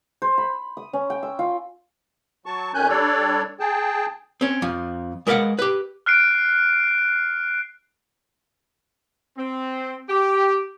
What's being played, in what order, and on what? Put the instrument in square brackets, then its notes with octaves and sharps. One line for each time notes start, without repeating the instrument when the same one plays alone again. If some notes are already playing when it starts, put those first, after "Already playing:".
[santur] C5
B5
D#6
C#4
G5
E6
F4
[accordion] F#3 A5 C#6
F2 D#3 C#4 G#5 F#6 G6
G3 D4 A4 C#5 D5
G#4 G5 A5
[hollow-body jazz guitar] C4 C#4
F2 F3
G#3 A#4 B4 D5 F5 F#5
G4 B4
[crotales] F6 F#6 C7 D7
[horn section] C4
G4